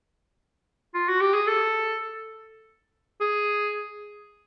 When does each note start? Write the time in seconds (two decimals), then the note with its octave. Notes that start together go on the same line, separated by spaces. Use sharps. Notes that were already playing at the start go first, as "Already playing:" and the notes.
0.94 F4
1.08 F#4
1.21 G4
1.34 G#4
1.47 A4
3.21 G#4